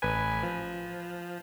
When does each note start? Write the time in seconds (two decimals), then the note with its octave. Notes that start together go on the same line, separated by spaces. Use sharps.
0.02 A1 B4 G#5
0.43 F3